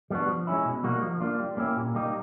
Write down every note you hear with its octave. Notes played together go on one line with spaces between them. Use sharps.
G3 B3 D4 F#4
F3
G#3 C#4 E4
B2
G3 A#3 D#4 F#4
F3
A#3 D4 F4
G3
A#3 C#4 E4 G4
A#2
G3 A#3 D#4 G4